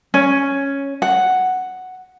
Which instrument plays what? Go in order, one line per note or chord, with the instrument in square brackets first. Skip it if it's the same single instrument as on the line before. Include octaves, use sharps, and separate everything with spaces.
[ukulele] C#4
F#5